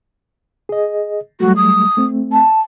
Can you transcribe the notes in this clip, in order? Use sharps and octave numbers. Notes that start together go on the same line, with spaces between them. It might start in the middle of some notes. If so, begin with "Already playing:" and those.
G#4 D#5
F#3 G3 A3 F#4
D#6
A3 C4
A5